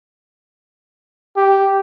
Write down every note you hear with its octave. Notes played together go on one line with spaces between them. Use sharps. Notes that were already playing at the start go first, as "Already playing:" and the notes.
G4